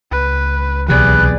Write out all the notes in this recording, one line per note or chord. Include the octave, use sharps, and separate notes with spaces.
C#2 B4
B1 C3 E3 G#4 B4 D5